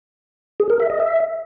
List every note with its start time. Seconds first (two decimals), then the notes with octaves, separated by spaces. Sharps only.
0.60 G#4
0.70 A#4
0.80 E5
0.90 D#5
1.00 E5